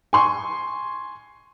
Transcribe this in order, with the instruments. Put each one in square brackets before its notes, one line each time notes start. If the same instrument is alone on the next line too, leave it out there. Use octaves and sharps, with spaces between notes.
[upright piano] G#5 C6 C#6